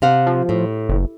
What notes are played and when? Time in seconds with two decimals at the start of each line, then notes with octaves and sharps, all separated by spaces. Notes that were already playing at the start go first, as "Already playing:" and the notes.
0.02 C3 F5 F#5
0.27 F3
0.49 A2
0.89 F#1